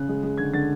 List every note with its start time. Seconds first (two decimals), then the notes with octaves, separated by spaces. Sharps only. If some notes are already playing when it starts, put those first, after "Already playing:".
Already playing: C#3 F#6
0.09 G#3
0.23 G#3
0.38 D3 G#6
0.53 D3 A6